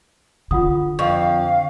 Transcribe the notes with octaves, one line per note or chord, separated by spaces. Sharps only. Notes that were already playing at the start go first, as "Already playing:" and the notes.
D3 F4 F#5 D#6
F2 F5 C#6